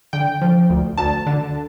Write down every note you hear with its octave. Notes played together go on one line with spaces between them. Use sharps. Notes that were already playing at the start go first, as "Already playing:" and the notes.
D3 G5
F3
D2
D2 A5
D3